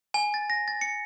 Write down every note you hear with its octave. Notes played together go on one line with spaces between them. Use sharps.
G#5
A6
A#6
A6
C#7